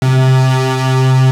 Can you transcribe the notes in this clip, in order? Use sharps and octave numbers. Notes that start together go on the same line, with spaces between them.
C3